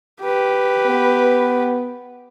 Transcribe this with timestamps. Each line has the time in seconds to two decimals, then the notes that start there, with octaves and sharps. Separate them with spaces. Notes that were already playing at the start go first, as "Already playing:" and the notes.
0.22 G4 B4
0.87 B3